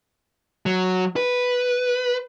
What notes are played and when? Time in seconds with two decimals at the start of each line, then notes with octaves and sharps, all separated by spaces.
0.66 F#3
1.16 B4